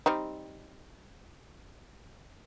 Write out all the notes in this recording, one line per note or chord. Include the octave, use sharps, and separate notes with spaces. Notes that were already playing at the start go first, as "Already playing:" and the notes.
G3 C4 D#4